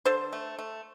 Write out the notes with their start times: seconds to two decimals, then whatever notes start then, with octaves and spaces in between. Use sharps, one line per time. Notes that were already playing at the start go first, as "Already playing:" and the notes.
0.05 D3 A4 C5
0.33 A3
0.59 A3